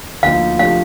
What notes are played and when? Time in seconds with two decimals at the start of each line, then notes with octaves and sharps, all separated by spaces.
0.23 D2 D3 F3 A#3 D#4 F5
0.59 C3 F3 A3 D4 F5